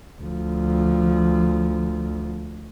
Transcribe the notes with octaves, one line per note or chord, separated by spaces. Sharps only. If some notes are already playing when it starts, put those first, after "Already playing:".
D2 F3